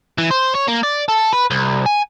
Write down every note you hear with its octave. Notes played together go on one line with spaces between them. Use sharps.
E3
C5
C#5
A#3
D5
A4
B4
C2
G#5